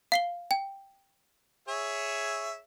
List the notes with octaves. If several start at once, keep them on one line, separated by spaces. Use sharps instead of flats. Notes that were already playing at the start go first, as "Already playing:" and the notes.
F5 C7 G7
G5
G#4 C#5 E5